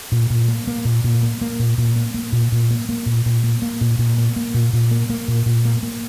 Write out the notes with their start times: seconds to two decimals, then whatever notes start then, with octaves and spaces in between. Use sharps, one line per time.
0.12 A#2
0.30 A#2
0.48 A#3
0.67 A#3
0.85 A#2
1.04 A#2
1.23 A#3
1.41 A#3
1.59 A#2
1.78 A#2
1.96 A#3
2.14 A#3
2.33 A#2
2.52 A#2
2.70 A#3
2.89 A#3
3.06 A#2
3.26 A#2
3.44 A#3
3.62 A#3
3.81 A#2
3.99 A#2
4.18 A#3
4.36 A#3
4.54 A#2
4.73 A#2
4.91 A#3
5.09 A#3
5.28 A#2
5.46 A#2
5.65 A#3
5.83 A#3